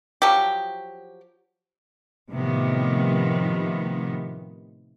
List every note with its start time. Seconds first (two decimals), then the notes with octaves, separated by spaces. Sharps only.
0.22 F3 F#3 G4
2.31 A2 C3 D#3 F3 B3